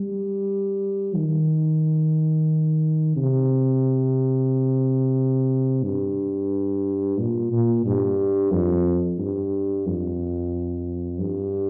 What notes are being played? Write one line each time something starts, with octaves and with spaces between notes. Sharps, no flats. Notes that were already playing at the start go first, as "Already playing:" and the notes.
Already playing: G3
D#3
C3
G2
A#2
A#2
G2
F2
G2
F2
G2